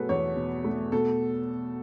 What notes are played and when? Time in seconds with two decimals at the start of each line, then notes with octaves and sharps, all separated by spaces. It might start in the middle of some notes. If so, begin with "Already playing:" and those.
Already playing: B2 F#3 A3 G#4 A4 B4
0.09 E2 C#5
0.36 B2
0.64 A3
0.92 B2 A4